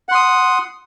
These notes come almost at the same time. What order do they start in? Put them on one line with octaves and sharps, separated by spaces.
F#5 C6 D#6